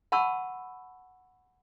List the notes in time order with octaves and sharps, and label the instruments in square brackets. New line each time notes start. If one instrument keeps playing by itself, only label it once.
[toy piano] F#5 A5 B5 C#6 E6